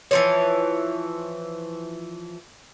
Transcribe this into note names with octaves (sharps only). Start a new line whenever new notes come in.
E3 F3 C#5